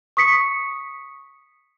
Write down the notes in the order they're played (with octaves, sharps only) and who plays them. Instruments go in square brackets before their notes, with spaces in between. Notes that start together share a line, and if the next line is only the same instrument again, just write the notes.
[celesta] C#6 D#6 B6 C#7